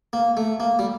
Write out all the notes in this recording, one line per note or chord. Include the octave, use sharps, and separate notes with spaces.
A#3
A3
A#3
G3